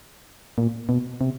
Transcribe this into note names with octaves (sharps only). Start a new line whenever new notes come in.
A#2
B2
C3